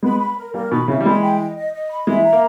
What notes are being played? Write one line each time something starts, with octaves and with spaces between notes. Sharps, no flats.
G#3 B3 B5
B5
A#4
G3 A#3 A#4
B2 D#3 B5
C#3 E3 E5
G3
E3 G#3 B5
G5
D#5
D#5
D#5
B5
E3 G#3 E5
A#5
A#3